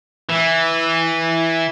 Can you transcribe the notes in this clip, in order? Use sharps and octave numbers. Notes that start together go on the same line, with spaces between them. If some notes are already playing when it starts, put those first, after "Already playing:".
E3